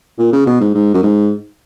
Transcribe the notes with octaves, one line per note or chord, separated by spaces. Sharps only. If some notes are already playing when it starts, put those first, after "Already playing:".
A#2
C#3
B2
G#2
G#2
F#2
G#2